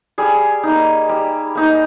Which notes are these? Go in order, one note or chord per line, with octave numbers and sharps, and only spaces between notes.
G3 G#4
A#3 D#4
G3
A#3 D#4